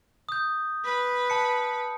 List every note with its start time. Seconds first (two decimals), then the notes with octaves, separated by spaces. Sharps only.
0.29 D#6 G6
0.84 B4
1.30 A5 C#7